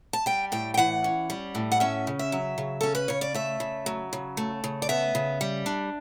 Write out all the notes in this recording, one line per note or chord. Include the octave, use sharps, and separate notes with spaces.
A5
G3 G5
A2 G5
G5
E3 F#5
C#4
G3
A2
F#5
C#4 E5
C#3
E5
F#3
C#3
C#4 A4
B4
C#3 C#5
D5
A3 E5
C#3
F#3
C#3
A3
C#3
D5
B3 E5
C#3
G3
D4